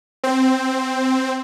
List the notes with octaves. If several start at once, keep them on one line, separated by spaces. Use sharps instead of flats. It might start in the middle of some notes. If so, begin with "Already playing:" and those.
C4